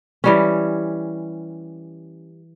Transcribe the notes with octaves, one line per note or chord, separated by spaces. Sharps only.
E3 G3 C#4